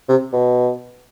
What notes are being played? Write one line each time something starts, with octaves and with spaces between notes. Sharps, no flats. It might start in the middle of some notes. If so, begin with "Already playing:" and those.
C3
B2